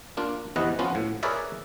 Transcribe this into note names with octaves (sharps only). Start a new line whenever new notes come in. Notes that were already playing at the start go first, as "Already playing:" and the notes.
A#3 D4 F4
E2 C3 E3 B4 D#5 F#5
F3 B3 C#4 F4 F#4
A2
G#4 A#4 B4 C#5 D5 E5